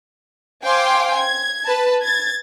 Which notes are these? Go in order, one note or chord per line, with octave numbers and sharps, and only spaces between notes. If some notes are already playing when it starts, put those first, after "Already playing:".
C5 F5 G5 G#5 C6 D6
G#6
B4 A5
G#6 A6